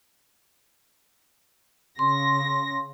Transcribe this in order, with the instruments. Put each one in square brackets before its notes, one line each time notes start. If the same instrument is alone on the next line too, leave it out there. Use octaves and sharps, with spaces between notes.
[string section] C#3 A#6 [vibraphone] C6